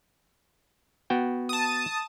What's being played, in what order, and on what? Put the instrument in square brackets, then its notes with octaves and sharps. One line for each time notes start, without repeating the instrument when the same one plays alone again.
[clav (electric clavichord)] B3 F#4 G5
[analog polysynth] A5 D#6